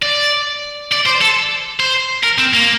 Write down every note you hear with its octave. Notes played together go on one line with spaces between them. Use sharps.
D5
D5
C5
A4
C5
A#4
C4
A#3